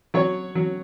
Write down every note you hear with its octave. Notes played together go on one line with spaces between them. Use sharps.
F#3 C#5
F#3